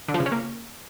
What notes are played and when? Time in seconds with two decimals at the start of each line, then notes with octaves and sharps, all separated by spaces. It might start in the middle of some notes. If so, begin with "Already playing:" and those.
0.08 D3
0.14 F3
0.20 C#3
0.26 C#4
0.32 A#3